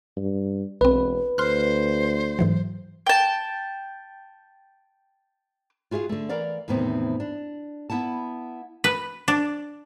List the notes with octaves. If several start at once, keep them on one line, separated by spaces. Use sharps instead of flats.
G2
E1 B1 C4 B4
D2 C5 C6 F6 F#6
G#2 E3 F#3
G5 A5
F4 F#4 G#4 E5 F5
D3 A3
E3 A#4 D5 F5
E2 A2 C3 D#3 B3 C4
D4
B3 E4 F#5 A5
B4
D4